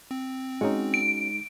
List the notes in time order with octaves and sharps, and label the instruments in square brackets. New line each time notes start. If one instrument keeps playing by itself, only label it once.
[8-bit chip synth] C4
[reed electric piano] G#3 D#4 [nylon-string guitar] C#4 F#4
[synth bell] D7